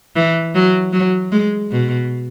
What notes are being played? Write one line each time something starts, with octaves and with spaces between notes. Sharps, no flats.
E3
F#3
F#3
G#3
B2